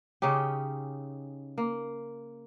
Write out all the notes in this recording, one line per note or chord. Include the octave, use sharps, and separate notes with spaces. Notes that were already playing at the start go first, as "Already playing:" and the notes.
C#3 C#4 D#4 G4
A#3